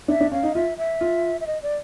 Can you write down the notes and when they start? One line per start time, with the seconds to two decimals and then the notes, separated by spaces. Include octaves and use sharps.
0.08 D4 E5
0.20 D4
0.32 C#4 F5
0.43 D#4
0.55 F4 E5
0.78 E5
1.01 F4
1.41 E5
1.47 D#5
1.63 D5